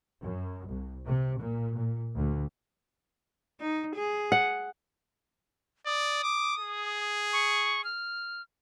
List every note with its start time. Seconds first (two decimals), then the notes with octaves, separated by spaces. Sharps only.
0.23 F#2
0.68 C2
1.05 C3
1.38 A#2
1.74 A#2
2.12 D2
3.60 D#4
3.95 G#4
4.32 F#5
5.86 D5 D#6
6.23 D6
6.60 G#4
7.33 C#6
7.84 F6